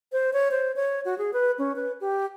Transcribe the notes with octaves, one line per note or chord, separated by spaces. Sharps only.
C5
C#5
C5
C#5
F#4
G#4
B4
C#4
B4
G4